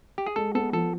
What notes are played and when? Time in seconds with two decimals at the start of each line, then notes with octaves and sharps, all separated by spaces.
0.18 G4
0.27 G#4
0.36 G#3 A4
0.55 B3 A4
0.73 F3 A4